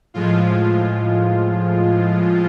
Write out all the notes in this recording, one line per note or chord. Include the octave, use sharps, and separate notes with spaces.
A2 F3 G#3 F4